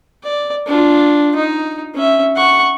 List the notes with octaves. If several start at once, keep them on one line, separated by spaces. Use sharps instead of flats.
D5
D4 F4
D#4
C#4 E5
F#5 C#6